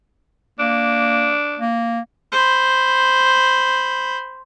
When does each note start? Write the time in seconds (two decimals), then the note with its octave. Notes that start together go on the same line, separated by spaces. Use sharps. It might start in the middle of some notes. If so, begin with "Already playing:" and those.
0.59 A#3 D4
1.59 A#3
2.32 C5 B5